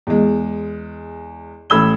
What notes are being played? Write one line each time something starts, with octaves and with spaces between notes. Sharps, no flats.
E2 G#3
A1 A3 B5 E6 G#6 G7